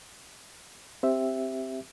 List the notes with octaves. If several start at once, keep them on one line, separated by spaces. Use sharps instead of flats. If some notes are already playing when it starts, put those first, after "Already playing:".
C4 G4 E5